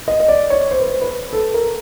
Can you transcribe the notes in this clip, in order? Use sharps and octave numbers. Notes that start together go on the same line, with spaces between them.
D#5
D#5
D5
C#5
C5
B4
C5
B4
A4
A#4